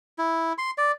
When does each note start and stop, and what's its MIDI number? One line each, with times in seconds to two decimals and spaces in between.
0.18 0.53 64
0.58 0.71 84
0.78 0.92 74